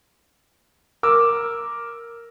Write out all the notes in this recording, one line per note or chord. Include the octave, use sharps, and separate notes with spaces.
A#4 D6 E6